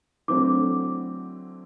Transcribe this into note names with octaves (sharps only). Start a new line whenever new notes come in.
D3 F#3 A3 C4 E4 D6